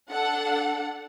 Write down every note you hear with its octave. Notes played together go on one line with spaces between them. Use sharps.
D4 A4 F#5